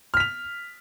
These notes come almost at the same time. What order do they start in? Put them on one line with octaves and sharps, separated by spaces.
F6 B6 F7